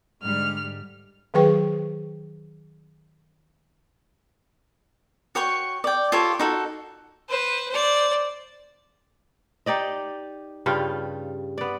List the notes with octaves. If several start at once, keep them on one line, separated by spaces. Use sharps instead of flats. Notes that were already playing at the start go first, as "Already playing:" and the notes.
G#2 D3 G3 F6
D#3 F#3 G#4 B4 G5 C#6
F#4 C#5 G5 C#6
D5 G5
F4 G4 A4 C#5
D#4 F#4 A4
B4 C5
C5 D5
D#4 G4 D5 D#5
G2 C#3 G3 F4
B3 D5